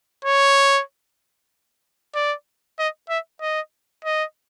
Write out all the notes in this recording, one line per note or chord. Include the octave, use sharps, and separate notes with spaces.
C#5
D5
D#5
E5
D#5
D#5